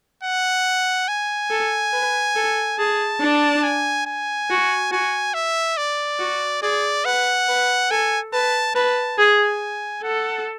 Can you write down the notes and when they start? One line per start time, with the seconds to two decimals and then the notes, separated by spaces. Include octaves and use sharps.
0.23 F#5
1.08 G#5
1.50 A4
1.93 B4
2.36 A4
2.78 G#4 A5
3.21 D4
3.63 G#5
4.06 G#5
4.50 F#4
4.91 F#4 G#5
5.34 E5
5.77 D5
6.19 F#4
6.62 G#4 D5
7.05 B4 F#5
7.48 B4
7.91 A4 G#5
8.33 B4 A5
8.75 B4 A5
9.18 G#4 G#5
10.04 A4 F#5